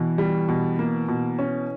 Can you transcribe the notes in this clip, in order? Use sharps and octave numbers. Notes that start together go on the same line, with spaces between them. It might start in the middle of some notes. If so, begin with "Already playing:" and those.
Already playing: B2 E3
G3
B2
A#3
B2
C#4